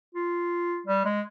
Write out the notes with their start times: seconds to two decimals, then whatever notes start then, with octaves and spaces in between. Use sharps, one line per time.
0.15 F4
0.87 G3
1.05 G#3